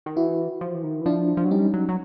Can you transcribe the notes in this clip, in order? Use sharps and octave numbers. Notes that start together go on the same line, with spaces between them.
D#3
E3 E4 F#4
F3
E3
D#3
E3
F3 D4 E4
F3
F#3
G3 C#4 D#4
F#3
F#3